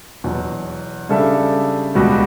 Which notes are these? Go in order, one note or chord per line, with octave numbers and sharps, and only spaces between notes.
E2 B2 F#3
C#3 G3 D4 A4 E5
C#2 B2 G3 B3 F#4